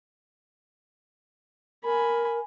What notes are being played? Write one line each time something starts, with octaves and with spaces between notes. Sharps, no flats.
A#4 G#5 B5